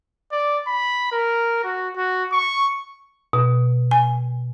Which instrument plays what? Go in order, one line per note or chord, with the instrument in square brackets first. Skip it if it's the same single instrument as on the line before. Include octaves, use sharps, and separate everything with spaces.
[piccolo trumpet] D5
B5
A#4
F#4
F#4
C#6
[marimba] B2
G#5